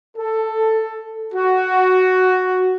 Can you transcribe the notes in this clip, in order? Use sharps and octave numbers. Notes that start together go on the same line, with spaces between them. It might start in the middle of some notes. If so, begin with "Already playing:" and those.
A4
F#4